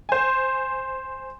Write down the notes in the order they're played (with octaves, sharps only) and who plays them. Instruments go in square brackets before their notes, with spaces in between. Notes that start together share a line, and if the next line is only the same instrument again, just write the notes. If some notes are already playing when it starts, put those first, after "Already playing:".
[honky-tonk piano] C5 G#5